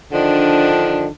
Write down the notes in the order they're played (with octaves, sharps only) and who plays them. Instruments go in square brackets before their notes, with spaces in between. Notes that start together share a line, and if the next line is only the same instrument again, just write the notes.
[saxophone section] D3 D#3 F3 D4